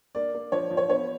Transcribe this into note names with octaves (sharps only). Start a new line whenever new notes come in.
A#3 D5
A#3
F3 C#5
F3
C#5
B3 C#5